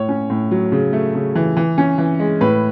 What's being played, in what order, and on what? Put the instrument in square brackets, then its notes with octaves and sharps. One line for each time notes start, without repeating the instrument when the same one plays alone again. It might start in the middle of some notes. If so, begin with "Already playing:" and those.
Already playing: [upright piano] A2 C#5
C#4
A2
F#3
C#3
A3
C#3
E3
E3
C#4
E3
G#3
A2 B4